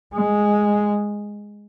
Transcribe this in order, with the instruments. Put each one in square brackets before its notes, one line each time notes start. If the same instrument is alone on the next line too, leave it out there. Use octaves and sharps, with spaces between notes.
[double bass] G#3